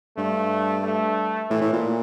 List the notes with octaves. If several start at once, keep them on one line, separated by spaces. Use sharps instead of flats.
G2 A3
A3
A2 E3
A2
A#2